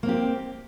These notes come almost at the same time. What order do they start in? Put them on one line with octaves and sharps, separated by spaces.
A#3 C4 G4